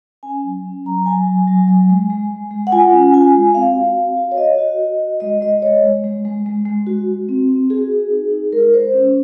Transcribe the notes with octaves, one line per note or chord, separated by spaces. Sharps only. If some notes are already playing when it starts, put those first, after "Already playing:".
C#4 G#5
F#3
C#4
F#3 A#5
F#3 G#5
F#3
F#3
F#3
G#3
G#3
G#3
G#3
F#5
F4 G#5
C#4
F4 G#5
G#3
C4 F5
F#4
C4
F#4
C#5
F#4 D#5
F#4
F#4
F#4
G#3 D#5
G#3 D#5
G#3 C#5
G#3
G#3
G#3
G#3
G#3
F#4
F#4
C4
C4
F#4 G#4
C4
D#4
D#4
G#3 A#4
G#3 C5
C#4